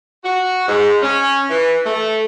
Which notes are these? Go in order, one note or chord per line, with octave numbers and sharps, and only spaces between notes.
F#4
G#2
C#4
E3
A3